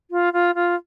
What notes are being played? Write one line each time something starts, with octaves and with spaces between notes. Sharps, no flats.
F4
F4
F4